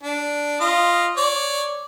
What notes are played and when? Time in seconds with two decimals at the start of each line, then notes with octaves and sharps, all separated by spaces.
0.03 D4
0.60 F4 D#5
1.17 C#5 D5